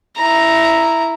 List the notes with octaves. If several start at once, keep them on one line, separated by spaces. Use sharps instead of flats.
E4 A#5